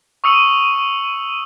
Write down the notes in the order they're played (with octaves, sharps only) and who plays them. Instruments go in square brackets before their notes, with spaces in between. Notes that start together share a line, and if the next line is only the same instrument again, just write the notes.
[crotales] C#6 D#6 E6 C#7 D#7 F#7